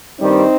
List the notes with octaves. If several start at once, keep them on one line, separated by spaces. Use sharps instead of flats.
G2 D#3 G3 C4 D#4